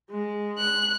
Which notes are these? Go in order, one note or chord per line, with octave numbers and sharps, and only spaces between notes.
G#3
F#6